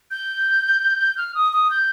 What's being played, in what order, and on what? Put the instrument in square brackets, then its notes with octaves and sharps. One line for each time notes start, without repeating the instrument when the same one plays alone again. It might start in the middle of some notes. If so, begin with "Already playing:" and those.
[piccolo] G6
F6
D#6
D#6
G6